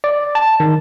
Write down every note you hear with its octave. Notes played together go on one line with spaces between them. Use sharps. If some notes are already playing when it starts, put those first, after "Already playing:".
D5
A5
D#3